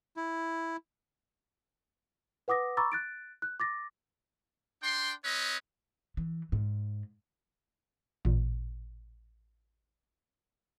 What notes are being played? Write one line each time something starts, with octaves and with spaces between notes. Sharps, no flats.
E4
B4 F#5 D6 D#6 A#6
A#5 B5 C#6 D6 E6 A6
F#6 A6 D7
F#6
D6 A6 A#6
D4 G5 C6
C4 B4 C#5 D#5
E3
G#2
A1 A#2